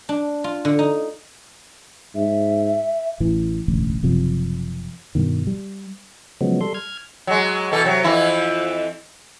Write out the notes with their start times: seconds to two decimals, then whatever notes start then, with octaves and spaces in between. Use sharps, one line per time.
0.09 D4
0.44 F4
0.65 D3
0.79 D#4
2.15 G#2 E5
3.20 A1 E3
3.68 E1 A1 D2
4.03 F#1 C3 F3
5.15 G2 B2 D#3
5.47 G3
6.41 C#3 F3 F#3 G#3 B3
6.61 G3 A4 C6
6.74 F6 G#6
7.27 F#3 G#3
7.72 B2 E3 A4
7.84 C3 F#3
8.04 F2 E3 E4